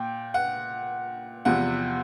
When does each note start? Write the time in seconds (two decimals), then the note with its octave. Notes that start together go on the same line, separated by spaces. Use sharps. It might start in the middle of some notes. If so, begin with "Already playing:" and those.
Already playing: A#2 G5
0.34 F#5
1.45 E2 C3 F3 F#5